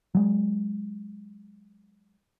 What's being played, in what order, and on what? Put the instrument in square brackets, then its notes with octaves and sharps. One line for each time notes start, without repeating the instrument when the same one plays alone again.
[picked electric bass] F#3 G#3